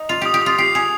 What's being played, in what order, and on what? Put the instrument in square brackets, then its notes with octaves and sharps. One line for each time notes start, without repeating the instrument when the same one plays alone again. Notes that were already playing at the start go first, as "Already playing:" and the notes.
Already playing: [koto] D#4
[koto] F4 [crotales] F7
[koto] G4 [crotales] D#6
[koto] G4
[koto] F4 [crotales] D#6
[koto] G4 [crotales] C7
[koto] G#4 [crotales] F7